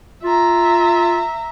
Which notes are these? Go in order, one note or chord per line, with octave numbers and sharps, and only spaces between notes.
F4 E5 A#5